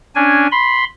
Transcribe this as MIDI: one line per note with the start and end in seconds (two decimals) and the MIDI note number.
0.16 0.47 61
0.16 0.47 62
0.16 0.47 80
0.52 0.84 83
0.52 0.84 84